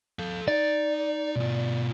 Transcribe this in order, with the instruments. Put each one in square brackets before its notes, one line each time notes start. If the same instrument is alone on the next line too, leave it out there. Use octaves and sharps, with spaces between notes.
[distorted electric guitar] A4 F5
[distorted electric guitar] D#4 [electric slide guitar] D5
[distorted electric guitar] B2 F4